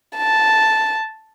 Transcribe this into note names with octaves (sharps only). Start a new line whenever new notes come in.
A5